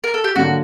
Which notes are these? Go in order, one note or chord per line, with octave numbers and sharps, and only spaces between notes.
A#4
A4
G4
D3 F#3 A#3 F#4